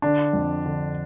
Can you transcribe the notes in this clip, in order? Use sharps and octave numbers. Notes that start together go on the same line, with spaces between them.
D3 D4
F2
D3